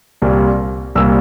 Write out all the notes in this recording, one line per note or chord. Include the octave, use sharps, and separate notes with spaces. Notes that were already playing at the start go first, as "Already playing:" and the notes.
C2 A#2 G3 A#3
C2 A#2 G3 A#3 E6